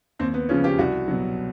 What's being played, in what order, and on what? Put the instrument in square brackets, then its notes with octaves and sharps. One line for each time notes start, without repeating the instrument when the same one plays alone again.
[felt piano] D#2 C4
B3
C#3 F3 C#4
G4
C2 F#4
B2 F#3